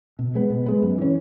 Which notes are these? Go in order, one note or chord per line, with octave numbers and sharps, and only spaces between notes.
B2
G#3 B3
B2
G#3 B3
F#2
E3 C#4